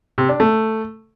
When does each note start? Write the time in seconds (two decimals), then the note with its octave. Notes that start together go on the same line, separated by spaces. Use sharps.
0.18 C3
0.29 D4
0.40 A3